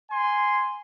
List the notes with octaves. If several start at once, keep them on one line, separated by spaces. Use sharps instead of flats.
G#5 C6